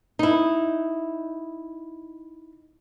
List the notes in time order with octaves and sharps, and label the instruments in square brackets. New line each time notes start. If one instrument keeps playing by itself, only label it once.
[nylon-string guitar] D#4 E4